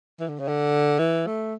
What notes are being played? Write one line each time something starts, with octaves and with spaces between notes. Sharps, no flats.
E3
D3
C#3
D3
E3
A3